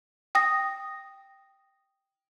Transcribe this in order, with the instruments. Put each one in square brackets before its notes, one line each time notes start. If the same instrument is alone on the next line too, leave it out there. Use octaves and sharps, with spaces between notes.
[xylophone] G5 D#6 A#6